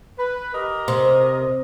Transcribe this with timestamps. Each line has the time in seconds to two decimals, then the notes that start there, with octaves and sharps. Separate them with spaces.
0.17 B4
0.53 G4 A#4 D#5
0.88 C3